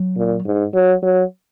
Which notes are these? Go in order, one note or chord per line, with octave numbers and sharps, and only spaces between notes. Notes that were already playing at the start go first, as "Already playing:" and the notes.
Already playing: F#3
A#2
G#2
F#3
F#3